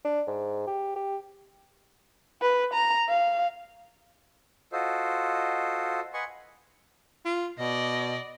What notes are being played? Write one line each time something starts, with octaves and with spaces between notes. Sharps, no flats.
D4
G#2
G4
G4
B4
A#5
F5
F4 F#4 A4 C5 D#5
B4 D#5 F#5 G#5 C6 C#6
F4
B2 D5 D#5